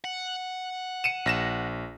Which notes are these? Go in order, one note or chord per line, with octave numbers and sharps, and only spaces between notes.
F#5
C#7 D#7 E7
A#1 A#6 E7